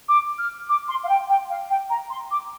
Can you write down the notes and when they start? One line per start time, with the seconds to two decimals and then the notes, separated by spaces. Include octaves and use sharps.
0.08 D6
0.38 F6
0.69 D6
0.88 C6
1.04 F5
1.09 G5
1.29 G5
1.50 F5
1.70 G5
1.90 A#5
2.10 C6
2.31 D6